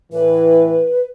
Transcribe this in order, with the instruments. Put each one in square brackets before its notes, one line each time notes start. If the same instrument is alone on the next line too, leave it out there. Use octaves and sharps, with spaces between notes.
[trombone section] A2 E3 [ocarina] B4